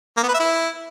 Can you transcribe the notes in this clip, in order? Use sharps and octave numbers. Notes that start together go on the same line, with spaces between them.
A#3
B3
B4
E5
E4